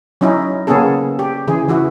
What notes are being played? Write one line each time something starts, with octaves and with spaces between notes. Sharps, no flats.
F#3 C#4 D#4 E4
C#3 A#3 B3 C#4 G#4 A4
G4
C#3 E3 G#4
E3 E4 F#4